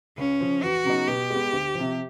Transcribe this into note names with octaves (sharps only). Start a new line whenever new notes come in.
C#2 C#4
C#3 F3
E2 F#4
C#3 F#3 B3 D#4
B2 G4
G#3 B3
D2
C3 F3